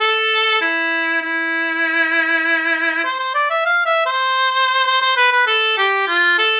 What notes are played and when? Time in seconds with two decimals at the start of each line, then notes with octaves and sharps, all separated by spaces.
0.01 A4
0.61 E4
1.22 E4
3.04 C5
3.19 C5
3.34 D5
3.50 E5
3.65 F5
3.86 E5
4.06 C5
4.87 C5
5.02 C5
5.16 B4
5.32 B4
5.47 A4
5.78 G4
6.08 F4
6.38 A4